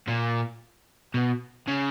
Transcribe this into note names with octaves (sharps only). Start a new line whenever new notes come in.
A#2
B2
C#3